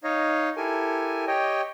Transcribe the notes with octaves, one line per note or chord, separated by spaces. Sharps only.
D#4 C#5 D#5 F5
E4 G4 A4 A#4 G#5
G4 C#5 D#5 G5